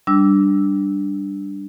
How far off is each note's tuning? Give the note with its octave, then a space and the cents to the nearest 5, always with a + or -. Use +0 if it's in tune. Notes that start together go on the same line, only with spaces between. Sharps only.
G3 +0 D4 +0 E6 -5